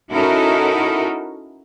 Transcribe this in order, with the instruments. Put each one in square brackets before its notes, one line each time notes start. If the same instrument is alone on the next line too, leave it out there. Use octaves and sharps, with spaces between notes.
[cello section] C#4 D#4 E4 F#4 A4 A#4